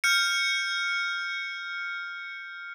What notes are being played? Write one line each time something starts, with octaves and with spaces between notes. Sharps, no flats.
F6 G6 C#7